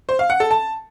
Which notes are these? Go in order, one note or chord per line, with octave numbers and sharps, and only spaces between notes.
C5
F5
F#5
A4
A5